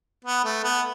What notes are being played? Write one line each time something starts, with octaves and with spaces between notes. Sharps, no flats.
B3
A3
B3